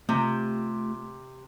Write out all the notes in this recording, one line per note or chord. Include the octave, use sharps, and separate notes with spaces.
C3 A3 F4 G4